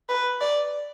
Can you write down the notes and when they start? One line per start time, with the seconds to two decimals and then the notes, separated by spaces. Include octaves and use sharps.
0.09 B4
0.41 D5